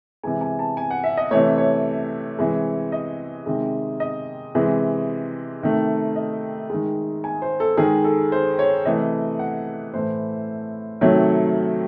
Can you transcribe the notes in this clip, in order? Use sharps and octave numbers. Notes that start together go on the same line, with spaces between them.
C3 E3 G#3 G#5
G#5
A5
G#5
F#5
E5
D#5
C3 E3 A3 C#5
C#5
C3 E3 G#3
D#5
C3 D#3 G#3
D#5
C3 E3 G#3
C3 D#3 A3
D#5
D#3 G#3
G#5
C5
A4
D#3 G#3 G#4
A4
C5
C#5
C3 E3 A3 D#5
F#5
A2 E3 A3 C5
C3 D#3 F#3 A3 C#5